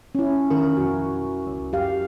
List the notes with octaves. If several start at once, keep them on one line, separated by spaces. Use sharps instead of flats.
C#4 E4
D#3 C#4 A#4
F2 B2 F#4
C#2
F#2 G4 F5